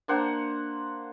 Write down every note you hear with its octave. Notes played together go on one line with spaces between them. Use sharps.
A#3 D4 C5 F#5